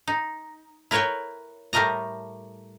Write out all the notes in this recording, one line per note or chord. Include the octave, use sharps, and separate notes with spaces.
D#4
E4 A#4 B4 C#5 E5 G5
A2 G3 A3 A#4 D#5 A#5